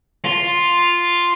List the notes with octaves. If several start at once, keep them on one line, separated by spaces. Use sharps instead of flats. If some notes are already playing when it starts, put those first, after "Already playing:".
F4